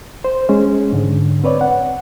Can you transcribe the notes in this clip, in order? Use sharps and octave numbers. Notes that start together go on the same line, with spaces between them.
C5
G#3 C#4
G#2 D3
C4 B4 C#5 D5
F#5